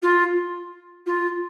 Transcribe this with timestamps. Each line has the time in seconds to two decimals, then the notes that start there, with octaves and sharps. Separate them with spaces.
0.02 F4
1.06 F4